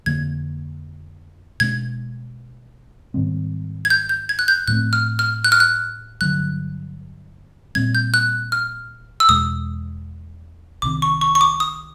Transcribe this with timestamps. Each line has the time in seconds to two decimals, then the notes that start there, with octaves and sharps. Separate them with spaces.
0.06 F2 D3 F3 A#3 G#6
1.60 B2 G#3 B3 D4 G#6
3.14 G#2 D#3 G3 C4
3.85 G#6
3.90 G6
4.09 G6
4.29 G#6
4.39 F#6
4.48 G6
4.68 A2 F3 A3 C4 F#6
4.93 F6
5.19 F6
5.44 F#6
5.52 F6
5.60 F#6
6.21 G2 D3 F#3 F#6
7.75 A#2 G3 C4 G#6
7.95 G6
8.14 F#6
8.52 F6
9.20 E6
9.29 E2 B2 G#3 D#6
10.82 C2 C3 D#3 D6
11.02 C#6
11.21 C#6
11.35 C#6
11.41 D6
11.60 D#6